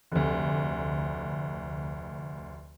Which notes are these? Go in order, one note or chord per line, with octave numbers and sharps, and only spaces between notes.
F1 D2